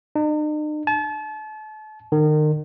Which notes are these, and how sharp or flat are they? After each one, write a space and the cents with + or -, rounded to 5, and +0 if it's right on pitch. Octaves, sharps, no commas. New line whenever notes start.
D#4 -45
A5 -35
D#3 -35